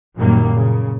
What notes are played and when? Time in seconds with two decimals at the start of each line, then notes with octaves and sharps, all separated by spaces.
0.18 F#2 A#2 D#3 F#3 G3 A#3
0.51 A#2 C#3